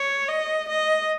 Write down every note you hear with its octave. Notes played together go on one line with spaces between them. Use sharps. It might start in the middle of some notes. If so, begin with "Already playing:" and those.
Already playing: C#5
D#5
D#5